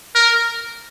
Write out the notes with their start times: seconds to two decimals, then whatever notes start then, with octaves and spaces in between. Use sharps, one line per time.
0.15 A#4